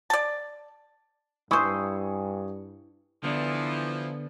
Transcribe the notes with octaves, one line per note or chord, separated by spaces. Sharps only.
D5 A5
G2 E4 C5 G#5 C#6 D#6
D3 E3 F3 B3 D4